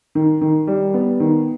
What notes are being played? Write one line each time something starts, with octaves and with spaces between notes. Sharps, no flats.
D#3
D#3
G3
B3
D#3